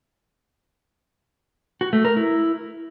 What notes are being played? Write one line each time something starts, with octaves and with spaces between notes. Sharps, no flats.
F#4
A3
A#4
E4